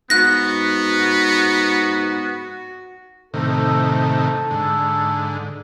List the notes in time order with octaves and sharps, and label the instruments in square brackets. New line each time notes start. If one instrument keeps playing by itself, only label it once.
[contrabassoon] G#2 [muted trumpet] B3 [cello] F#4 [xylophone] F#6 A#6
[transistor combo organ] A2 C3 D#3 [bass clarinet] A4
[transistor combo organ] G#2 D3